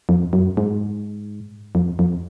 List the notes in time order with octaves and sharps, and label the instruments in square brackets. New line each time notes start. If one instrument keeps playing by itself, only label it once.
[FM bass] F2
F#2
G#2
F2
F2